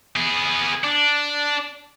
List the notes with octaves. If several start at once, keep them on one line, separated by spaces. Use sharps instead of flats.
B3 G#4
D4